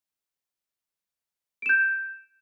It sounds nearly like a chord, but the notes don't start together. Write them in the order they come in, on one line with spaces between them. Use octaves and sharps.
D7 E7 G6